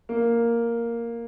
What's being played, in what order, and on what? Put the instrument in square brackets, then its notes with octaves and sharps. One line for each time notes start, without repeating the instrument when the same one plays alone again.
[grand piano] A#3